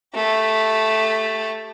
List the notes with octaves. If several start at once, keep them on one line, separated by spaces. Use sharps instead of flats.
A3 G4